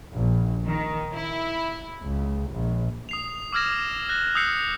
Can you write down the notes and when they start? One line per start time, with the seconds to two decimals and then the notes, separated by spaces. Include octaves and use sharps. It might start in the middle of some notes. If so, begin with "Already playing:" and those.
0.15 A#1
0.66 D#3
1.16 E4
2.02 C#2
2.52 A#1
3.09 D#6 C7 F7
3.53 D6 E6 F6 G#6 A#6 E7
4.09 F#6 A#6
4.35 D#6 E6 G6 C7 C#7